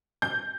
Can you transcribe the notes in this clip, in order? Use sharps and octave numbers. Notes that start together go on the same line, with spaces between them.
G6